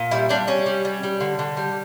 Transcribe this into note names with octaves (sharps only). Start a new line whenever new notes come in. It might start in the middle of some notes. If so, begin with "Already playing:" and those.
Already playing: A#2
G3 E4
G3 D4
G3 C#4
G3
G3
G3
D3
D3
G3